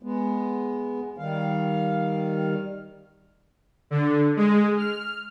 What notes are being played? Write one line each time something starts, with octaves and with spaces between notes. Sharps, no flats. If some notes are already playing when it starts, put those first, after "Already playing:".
G#3 B3
D#3 G3 F5
D3
G#3
F6